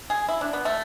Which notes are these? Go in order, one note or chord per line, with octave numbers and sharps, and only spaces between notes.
G#4
E4
D4
B3
A3